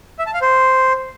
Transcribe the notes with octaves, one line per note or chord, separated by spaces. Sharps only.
E5
A5
F5
C5